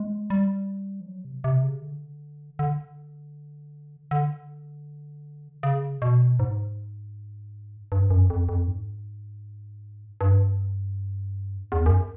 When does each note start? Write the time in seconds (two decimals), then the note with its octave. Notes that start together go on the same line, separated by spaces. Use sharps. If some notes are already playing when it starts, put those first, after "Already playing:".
Already playing: G#3
0.30 G3
1.00 F3
1.07 F#3
1.25 C3
1.44 C3
1.63 C#3
1.82 D3
2.59 D3
4.11 D3
5.63 C#3
6.02 B2
6.40 G#2
7.92 G2
8.10 F#2
8.30 F2
8.49 F2
8.67 G#2
10.21 G2
11.72 E2
11.86 F#2